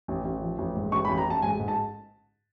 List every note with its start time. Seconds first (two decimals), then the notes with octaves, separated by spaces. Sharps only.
0.08 A1
0.25 A1
0.42 F3
0.58 A1
0.76 G#2
0.92 A1 C#6
1.05 B5
1.09 A1
1.18 A#5
1.26 A1 A5
1.42 G#2 G#5
1.60 G#2
1.68 A5